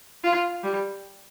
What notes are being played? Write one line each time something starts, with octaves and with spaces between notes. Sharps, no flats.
F4
G3